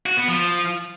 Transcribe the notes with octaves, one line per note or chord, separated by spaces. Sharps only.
F#4
B3
F3